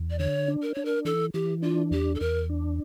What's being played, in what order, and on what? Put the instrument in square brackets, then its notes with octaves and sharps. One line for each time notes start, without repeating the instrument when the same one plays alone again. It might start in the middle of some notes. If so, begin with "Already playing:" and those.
Already playing: [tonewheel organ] E2
[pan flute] D5
[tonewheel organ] D3 [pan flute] C#5
[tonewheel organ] D4
[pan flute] A#4
[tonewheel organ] D4 [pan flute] C#5
[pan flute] A#4
[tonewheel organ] E3 [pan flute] A4
[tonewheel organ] E3 [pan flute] G4
[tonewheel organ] D4 [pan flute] F4
[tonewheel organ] E2 [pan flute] G4
[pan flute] A4
[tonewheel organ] E2 [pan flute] A#4
[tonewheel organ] D4